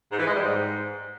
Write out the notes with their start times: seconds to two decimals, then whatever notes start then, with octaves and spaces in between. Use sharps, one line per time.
0.10 G#2
0.18 E3
0.26 G#3
0.34 G3
0.42 G#2